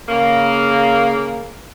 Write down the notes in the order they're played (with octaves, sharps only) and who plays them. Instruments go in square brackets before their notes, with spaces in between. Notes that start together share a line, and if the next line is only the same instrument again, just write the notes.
[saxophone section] C#3 A#3